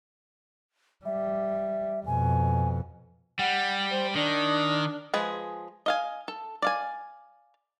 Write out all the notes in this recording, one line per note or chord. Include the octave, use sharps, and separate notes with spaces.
G3 E5
F2 B2 G#5
G3 F#5
C5
D#3 D4
F3 G#3 G#4 B4
D#5 F5 G#5
A4
D5 F5 G#5